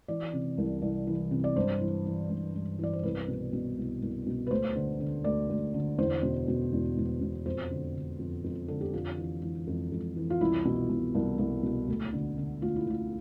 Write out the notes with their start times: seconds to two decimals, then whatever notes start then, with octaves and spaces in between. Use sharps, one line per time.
0.08 E3 D5
0.33 C3
0.58 C2
0.82 C2
1.07 E3
1.31 C3
1.44 D5
1.56 G2 C5
1.81 E3
2.05 E3
2.30 G2
2.55 G2
2.79 E3 D5
2.93 C5
3.03 C2 B4
3.28 B2
3.53 B2
3.77 C2
4.02 C2
4.26 B2
4.47 B4
4.51 D2 C5
4.76 D3
5.00 D3
5.24 D2 D5
5.49 D2
5.74 D3
5.98 E2 C5
6.23 B2
6.48 B2
6.72 E2
6.97 E2
7.21 B2
7.46 F2 C5
7.71 D3
7.95 D3
8.19 F2
8.44 F2
8.68 D3 A4
8.81 G4
8.93 F2 F4
9.18 E3
9.42 E3
9.67 F2
9.92 F2
10.16 E3
10.30 F4
10.41 C2 E4
10.65 B2
10.90 B2
11.15 C2
11.39 C2
11.63 B2
11.88 D2
12.13 D3
12.38 D3
12.62 D2 F4
12.76 E4
12.87 D2 F4